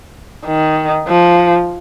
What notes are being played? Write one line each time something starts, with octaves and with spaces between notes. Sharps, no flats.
D#3
F3